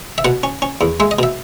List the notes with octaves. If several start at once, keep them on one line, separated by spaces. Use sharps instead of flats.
E5
B2 F#5
C#4
C#4
E2
G#3 E5
D#5
B2 E5